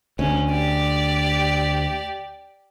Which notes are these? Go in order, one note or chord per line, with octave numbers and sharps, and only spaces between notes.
D2 C#4
G4 D5